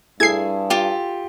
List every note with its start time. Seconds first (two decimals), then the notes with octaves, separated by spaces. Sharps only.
0.20 G2 E4 G#4 A4 G#6 C7
0.70 F4 G4